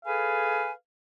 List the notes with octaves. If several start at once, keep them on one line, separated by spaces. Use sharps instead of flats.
G#4 A4 B4 F5 G#5